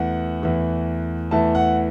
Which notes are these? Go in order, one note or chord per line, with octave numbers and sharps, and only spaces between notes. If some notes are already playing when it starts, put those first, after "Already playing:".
Already playing: E2 E3 A3 F#5
E2 E3 A3
E2 E3 A3 A5
F#5